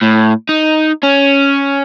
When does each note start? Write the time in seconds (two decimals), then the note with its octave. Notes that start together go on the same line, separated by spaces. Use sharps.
0.02 A2
0.49 D#4
1.03 C#4